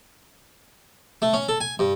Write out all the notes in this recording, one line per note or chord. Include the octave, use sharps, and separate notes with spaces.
A3
C#4
A4
G#5
G2